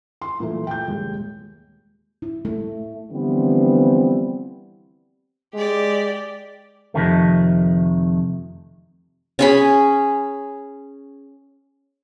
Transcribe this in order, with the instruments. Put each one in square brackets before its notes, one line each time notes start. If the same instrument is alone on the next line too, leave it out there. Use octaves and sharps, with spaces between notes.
[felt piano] C6
A#2 E3 A3
G5 G6
D#1 G#3
[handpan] E4
A3
[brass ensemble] D3 E3 F3 G3 B3 C4
[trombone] G#3 [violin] G4 D5
[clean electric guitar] F2 C3 D#3 A3
[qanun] C#4 G#4 B5